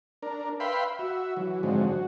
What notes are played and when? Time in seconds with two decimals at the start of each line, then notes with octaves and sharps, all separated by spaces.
0.23 D4 A#4
0.60 B4 E5 F5 G5 B5 C6
0.99 F#4 E5
1.37 E3 F#3
1.63 G#2 D3 F3 F#3 G#3 C4
1.87 F#4